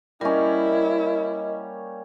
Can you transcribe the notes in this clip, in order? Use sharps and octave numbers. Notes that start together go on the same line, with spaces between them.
G3 A#3 C#4 E4 A#4 D#5